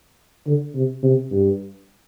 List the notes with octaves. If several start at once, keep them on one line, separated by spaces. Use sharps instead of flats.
D3
C3
C3
G2